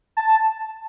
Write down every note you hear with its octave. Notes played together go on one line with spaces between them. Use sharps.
A5